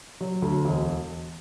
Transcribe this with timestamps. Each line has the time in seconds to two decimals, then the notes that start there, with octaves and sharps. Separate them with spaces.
0.21 F#3
0.42 D2
0.65 E1